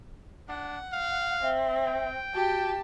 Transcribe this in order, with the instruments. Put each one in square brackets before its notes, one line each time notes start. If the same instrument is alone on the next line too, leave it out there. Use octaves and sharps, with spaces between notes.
[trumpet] D4 [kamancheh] F#5
[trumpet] F5
[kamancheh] C4 [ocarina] E5
[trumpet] G5
[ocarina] F#4 [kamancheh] G4 A5